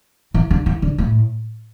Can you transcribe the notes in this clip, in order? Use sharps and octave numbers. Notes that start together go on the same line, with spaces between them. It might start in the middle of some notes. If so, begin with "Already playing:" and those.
E3
D3
E3
D3
A2